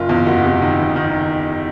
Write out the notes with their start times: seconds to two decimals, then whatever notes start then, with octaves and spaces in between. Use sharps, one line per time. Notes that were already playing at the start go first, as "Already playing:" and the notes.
Already playing: F#1 F4
0.09 E2
0.26 F#1 F#4
0.44 C3
0.62 D#3
0.78 F#1
0.96 D#3